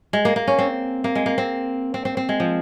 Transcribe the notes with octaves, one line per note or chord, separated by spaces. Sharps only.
G#3
A#3
A#3
C#4
C4
A#3
G#3
A#3
C4
C4
C4
C4
G#3
F3